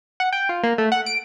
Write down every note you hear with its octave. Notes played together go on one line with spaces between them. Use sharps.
F#5
G5
F4
A#3
A3
F#5
D7